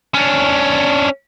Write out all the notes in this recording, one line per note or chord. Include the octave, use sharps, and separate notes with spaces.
C#4 D4